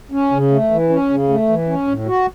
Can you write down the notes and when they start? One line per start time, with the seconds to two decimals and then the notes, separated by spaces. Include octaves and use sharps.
0.12 C#4
0.31 C#3
0.51 A3
0.71 E3
0.89 C#4
1.10 C#3
1.29 A3
1.49 E3
1.67 C#4
1.87 A2
2.07 F#4